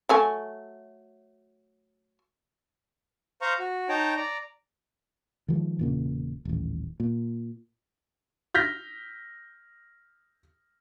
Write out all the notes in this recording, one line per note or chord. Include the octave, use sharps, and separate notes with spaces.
F#3 A3 G#5
C5 F5 A#5 C#6
F#4
D#4 C#5 G5 A5 A#5
D5 A#5
D#3 F3 G#3
E1 A#2 C#3
D#1 A1
A#2
F6 G6 A#6 B6